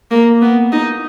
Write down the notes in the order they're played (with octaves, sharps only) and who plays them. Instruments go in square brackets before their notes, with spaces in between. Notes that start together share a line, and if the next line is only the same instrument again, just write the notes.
[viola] A#3
B3
D#4